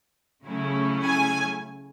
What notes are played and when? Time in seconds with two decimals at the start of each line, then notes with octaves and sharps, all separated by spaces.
0.46 C#3 F#3 A3 C#4 E4
1.06 G#5